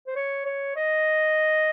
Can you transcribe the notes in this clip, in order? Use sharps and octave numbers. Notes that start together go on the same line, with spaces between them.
C5
C#5
C#5
D#5